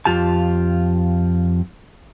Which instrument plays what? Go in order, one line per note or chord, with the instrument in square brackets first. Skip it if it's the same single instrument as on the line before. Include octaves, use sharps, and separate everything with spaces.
[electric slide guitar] F2 F4 G4 A5